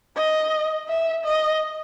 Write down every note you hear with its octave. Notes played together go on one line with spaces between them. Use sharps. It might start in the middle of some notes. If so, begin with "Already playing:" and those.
D#5
E5
D#5